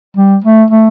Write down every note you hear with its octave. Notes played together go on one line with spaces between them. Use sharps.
G3
A3
A3